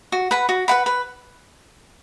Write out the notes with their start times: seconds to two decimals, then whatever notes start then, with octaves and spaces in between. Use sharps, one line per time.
0.12 F#4
0.31 B4 F#5 B5
0.49 F#4
0.68 B4 F#5 B5
0.86 B4